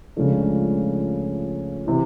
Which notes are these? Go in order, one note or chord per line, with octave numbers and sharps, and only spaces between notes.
C#2 C#3 F3 A3 D4
C3 E3